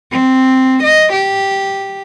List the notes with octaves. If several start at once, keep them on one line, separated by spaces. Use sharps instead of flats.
C4
D#5
G4